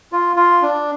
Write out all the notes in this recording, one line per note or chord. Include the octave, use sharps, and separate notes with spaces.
F4
F4
D4